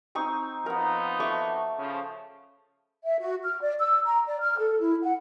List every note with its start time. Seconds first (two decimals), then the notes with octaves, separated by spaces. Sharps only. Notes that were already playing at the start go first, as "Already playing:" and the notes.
0.15 C4 D#4 C#6
0.66 F3 B3 D#4 A#4 F#5
1.20 A3 C#6 D6
1.79 C#3 F3
3.06 E5
3.19 F#4
3.44 F6
3.61 D5
3.79 E6
4.04 A#5
4.27 D5
4.40 F6
4.57 A4
4.80 E4
5.03 F#5